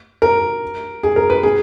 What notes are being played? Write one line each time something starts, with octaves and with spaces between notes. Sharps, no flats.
A#4
G#4
A#4
B4
G#4